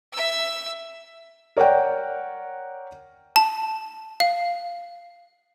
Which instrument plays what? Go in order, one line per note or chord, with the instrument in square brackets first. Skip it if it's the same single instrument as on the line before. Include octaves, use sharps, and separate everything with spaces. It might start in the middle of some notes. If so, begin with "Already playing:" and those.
[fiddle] E5 E6
[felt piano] A#4 C#5 D5 F#5 G5
[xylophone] A5
F5